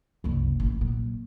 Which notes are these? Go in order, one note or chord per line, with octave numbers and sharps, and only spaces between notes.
F#1 C2
A1
A#2 F#3